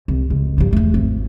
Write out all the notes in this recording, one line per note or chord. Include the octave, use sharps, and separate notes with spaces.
C2
C#2
G2 F3
E2 A3
G#1